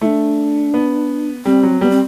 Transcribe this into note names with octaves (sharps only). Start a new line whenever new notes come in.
A3 D4 E4
B3
G3 C4
F#3
G3 B3
C4